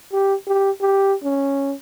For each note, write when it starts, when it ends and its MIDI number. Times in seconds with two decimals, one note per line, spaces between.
0.13 0.35 67
0.47 0.71 67
0.81 1.14 67
1.24 1.74 61